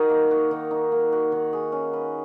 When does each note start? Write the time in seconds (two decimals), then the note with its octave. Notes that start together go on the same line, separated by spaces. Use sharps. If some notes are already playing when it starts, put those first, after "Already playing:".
Already playing: D#3 D#4 F#4
0.10 A#3
0.31 F#4
0.51 D#3
0.71 D#4
0.92 A#3
1.12 F#4
1.32 D#3
1.53 G#4
1.72 C#4
1.93 B4